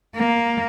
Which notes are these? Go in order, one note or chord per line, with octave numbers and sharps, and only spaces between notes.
A#3